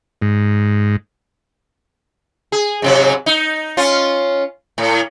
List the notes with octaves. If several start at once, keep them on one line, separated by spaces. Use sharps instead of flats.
G#2
G#4
G#2 C3 F#3
D#4
C#4 F4
A2